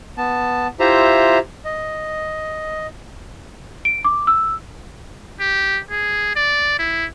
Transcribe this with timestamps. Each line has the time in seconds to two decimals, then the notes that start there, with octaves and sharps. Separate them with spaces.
0.18 B3 A5
0.80 E4 F4 G4 C5 E5 A#5
1.65 D#5
3.85 D7
4.05 D6
4.27 E6
5.40 G4
5.91 G#4
6.36 D5
6.79 E4